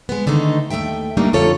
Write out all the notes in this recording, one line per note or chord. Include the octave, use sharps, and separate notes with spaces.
G#3 B3
D3 D#3 A3 D#4
D#2 A3 C4 E5 G5
G3 A3 A#3 D4 D#4
F2 D3 F4 A4 C#5